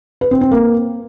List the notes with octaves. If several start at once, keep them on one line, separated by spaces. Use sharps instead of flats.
B4
C4
C4
A#3